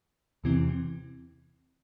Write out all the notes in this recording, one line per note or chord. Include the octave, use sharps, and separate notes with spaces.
E2 C3 E3 C4